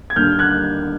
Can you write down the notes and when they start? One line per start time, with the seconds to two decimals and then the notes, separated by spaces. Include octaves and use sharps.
0.10 G#6
0.16 D#2 D3 G3 A#3 D4 F6 G6
0.39 F#6 G#6